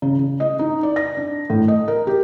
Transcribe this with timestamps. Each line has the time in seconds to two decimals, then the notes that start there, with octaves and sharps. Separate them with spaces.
0.02 C#3
0.19 C#3
0.40 D#5
0.59 D#4
0.83 D5
0.96 A#6
1.17 D4
1.50 A2
1.68 D#5
1.88 A#4
2.07 G4